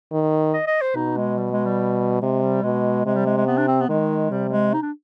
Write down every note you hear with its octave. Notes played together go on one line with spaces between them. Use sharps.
D#3
D#5
D#5
C5
B2 D#4
G#3
G3
G#3
G3
C3 G#3
G3
B2 G#3
C3 G#3
G3
G#3
G#3
B3
D4
C4
B3
D#3 G#3
C3 G3
G3
G#3
D#4
D4